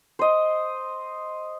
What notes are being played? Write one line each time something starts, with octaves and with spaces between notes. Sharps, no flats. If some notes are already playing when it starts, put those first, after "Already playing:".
C5 D#5